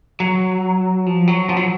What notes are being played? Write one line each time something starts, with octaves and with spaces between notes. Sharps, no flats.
F#3
F3
F#3
F3
F#3